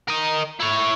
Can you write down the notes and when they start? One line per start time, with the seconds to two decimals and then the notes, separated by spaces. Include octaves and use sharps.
0.08 A#4 D#5
0.60 E4 C#5